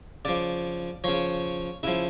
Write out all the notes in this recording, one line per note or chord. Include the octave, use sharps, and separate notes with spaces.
C#3 F3 D5
C#3 F3 C#5
C#3 F3 E4